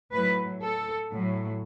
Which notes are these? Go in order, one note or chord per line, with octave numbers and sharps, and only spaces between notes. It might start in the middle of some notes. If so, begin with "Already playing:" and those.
A2 F#3 B4
A4
A2 F#3